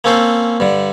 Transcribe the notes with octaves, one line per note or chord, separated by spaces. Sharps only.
A#3 C4 C#4 A4 C5
G2 D3